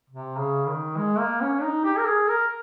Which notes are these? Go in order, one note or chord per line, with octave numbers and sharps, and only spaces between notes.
C3
C#3
D#3
G#3
A#3
C#4
D#4
G4
A#4
G#4
A#4